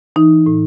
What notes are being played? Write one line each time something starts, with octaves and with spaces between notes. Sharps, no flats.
E3 D#4
A2